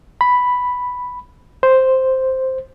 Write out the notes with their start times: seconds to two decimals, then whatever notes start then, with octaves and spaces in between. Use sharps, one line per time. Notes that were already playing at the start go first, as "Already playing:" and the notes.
0.21 B5
1.63 C5